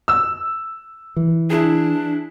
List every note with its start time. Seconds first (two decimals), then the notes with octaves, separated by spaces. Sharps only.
0.08 E6
1.16 E3
1.50 D4 E4 G#4